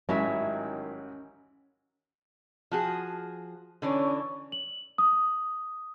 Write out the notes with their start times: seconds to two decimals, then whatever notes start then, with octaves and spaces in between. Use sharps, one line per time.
0.09 A1 G#2 D#3 F#3 C#4 E4 E5
2.71 F3 F#4 G#4
3.82 D3 E3 C#4 D5
4.52 F#7
4.98 D#6